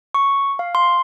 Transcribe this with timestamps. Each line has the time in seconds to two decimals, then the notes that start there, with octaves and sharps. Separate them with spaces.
0.14 C#6
0.59 F5
0.75 C6